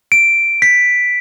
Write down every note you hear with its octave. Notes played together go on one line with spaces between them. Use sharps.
D7
B6